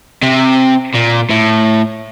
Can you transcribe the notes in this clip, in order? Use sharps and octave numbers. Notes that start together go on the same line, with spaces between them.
C3
A#2
A2